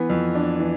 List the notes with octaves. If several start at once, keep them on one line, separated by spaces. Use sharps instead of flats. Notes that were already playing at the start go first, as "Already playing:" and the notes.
Already playing: E3 B3
F2
D4
E3